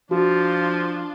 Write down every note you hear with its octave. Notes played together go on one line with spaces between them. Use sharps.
F3 D4 F4 F#4